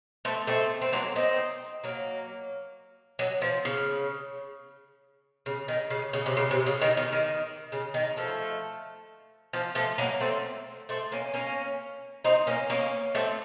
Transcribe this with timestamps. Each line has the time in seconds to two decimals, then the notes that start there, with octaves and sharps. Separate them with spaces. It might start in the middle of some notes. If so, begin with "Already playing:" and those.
0.25 A3 C4
0.47 A3 C4
0.81 C4
0.93 F#3 A#3
1.16 C4 D#4
1.84 F#3 A#3
3.19 F#3
3.42 F3
3.65 C#3
5.46 C#3
5.68 D#3
5.90 C#3
6.13 C#3
6.26 C3
6.37 C#3
6.51 C3
6.66 C#3
6.81 D#3
6.97 D#3
7.12 D#3
7.72 C#3
7.94 D#3
8.17 F3 A3
9.53 F3
9.75 F3 A3
9.98 F#3 A#3
10.20 A3 C4
10.89 A3 C4
11.12 A#3 C#4
11.34 A#3 C#4
12.24 C4 D#4
12.47 A#3 C#4
12.70 A#3 C#4
13.15 A3 C4